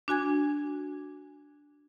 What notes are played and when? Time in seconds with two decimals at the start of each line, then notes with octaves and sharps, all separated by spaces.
0.08 D4 F#4 G#5 G#6